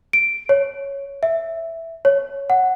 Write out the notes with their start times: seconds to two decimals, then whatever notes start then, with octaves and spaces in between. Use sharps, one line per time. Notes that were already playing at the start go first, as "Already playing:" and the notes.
0.13 D7
0.49 C#5
1.23 E5
2.05 C#5
2.50 F#5